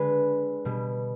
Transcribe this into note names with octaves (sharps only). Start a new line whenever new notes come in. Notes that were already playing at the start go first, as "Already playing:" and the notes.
Already playing: D3 G#3 B4
B2 G3